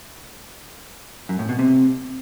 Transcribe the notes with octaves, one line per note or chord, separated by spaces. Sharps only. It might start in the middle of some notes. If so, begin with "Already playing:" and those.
F#2
A2
B2
C3